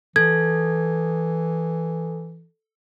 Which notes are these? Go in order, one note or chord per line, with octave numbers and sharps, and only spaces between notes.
E3 A4 G#6